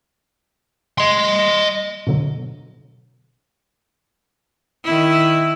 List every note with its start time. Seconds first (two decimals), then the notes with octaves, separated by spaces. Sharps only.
0.99 D#5 C6
2.07 B2 D3 F#3
4.84 D#3 E4